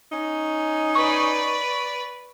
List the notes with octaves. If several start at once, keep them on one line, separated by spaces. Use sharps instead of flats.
C#4 D#4
B4 D5 C#6